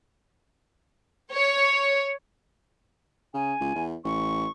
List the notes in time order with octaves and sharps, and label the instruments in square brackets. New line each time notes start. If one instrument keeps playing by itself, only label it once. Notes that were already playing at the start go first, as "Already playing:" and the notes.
[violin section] C#5
[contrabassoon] C#3 [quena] G#5
[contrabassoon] C#2
E2
[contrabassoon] A1 [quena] C#6